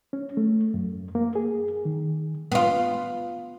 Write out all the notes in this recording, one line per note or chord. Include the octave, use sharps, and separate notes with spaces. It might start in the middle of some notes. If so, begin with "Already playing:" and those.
C#4
A3
F#2
A#3
G#4
D#3
B3 F4